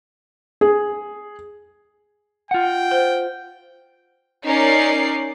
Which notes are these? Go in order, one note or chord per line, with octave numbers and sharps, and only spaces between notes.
G#4
F4 F#5 G5
C5
C#4 D#4 A#4 D5 C7